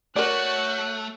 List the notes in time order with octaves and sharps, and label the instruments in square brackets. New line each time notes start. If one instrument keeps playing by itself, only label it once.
[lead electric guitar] A3 [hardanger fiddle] F#4 C#5 [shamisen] A#4 D5 [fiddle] F#6